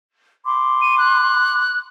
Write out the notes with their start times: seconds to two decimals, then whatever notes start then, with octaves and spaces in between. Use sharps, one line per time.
0.44 B5 C6 D6
0.82 D#7
0.98 F#6